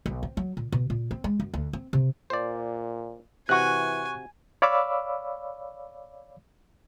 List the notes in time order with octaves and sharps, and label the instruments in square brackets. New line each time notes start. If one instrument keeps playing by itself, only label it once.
[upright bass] B1
C4
F#3
A#2
B2
A#2
C4
G#3
F#2
D2
C4
C3
[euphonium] A#2 [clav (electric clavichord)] C5 D5
[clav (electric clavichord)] C3 F#4 [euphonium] E3 [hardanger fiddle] G#5 [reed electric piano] C#6 F#6
[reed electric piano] C#5 D5 F5 B5 D6 E6